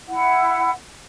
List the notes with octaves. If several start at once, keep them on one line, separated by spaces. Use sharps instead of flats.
E4 F#5